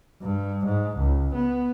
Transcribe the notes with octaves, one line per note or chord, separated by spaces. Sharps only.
G2
G#2
C#2
B3